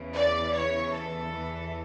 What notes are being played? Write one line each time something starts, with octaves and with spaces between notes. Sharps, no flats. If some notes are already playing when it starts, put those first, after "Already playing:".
Already playing: E2 C#3 E3
D5
C#5
A4
E2 E3